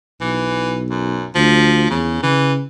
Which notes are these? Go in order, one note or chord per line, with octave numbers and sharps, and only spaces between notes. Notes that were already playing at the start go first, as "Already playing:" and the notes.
B1 E3
F#2
D2 F3
E2 C#3
C#3 E3